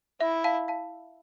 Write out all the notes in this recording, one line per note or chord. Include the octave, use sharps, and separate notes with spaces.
E4 E5
F5 A5
F5 A5